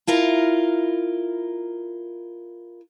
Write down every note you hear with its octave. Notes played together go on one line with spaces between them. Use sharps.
E4 F4 A#4 A#5